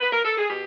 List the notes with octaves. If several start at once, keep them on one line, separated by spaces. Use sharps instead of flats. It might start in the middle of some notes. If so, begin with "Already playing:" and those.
B4
A#4
A4
G#4
B2 G4